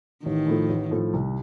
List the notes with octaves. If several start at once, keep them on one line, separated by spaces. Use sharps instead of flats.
A1 D#3
A2 F3 A3
A1
A2 F3 A3
C2